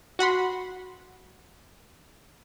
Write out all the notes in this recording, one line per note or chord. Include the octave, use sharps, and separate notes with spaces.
F#4 F#5 B5 C6